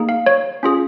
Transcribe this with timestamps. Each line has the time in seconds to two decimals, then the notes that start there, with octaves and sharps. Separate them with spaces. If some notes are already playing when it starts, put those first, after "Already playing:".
Already playing: A#3 D#4 G#4
0.09 F5
0.26 C#5
0.63 C#4 F4 G#4